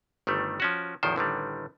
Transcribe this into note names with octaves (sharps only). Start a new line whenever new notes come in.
G1 D#3 G3 A3
F3 C#4 F#4
A1 E2 D#3 F3 C5
A1 D3 D#3 G3